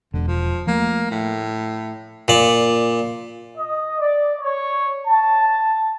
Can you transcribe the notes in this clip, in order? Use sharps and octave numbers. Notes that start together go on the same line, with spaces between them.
E1 D3
F3
F3 A3 A#3
A2
A#2 D5
D#5
D5
C#5
A5